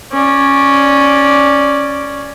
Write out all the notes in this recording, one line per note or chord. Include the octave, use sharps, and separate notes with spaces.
C#4 D5